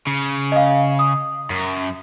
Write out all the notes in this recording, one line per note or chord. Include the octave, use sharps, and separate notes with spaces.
C#3
D#5 F5
D#6
F#2